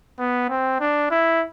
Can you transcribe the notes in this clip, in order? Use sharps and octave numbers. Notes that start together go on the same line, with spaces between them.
B3
C4
D4
E4